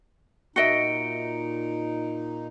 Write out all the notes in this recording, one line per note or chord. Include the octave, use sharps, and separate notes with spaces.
A#2 D#4 F#4 D#5 E5 C#7 D7